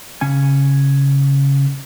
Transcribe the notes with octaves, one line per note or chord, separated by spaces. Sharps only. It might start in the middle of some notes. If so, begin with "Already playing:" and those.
C#3 C#4 G#5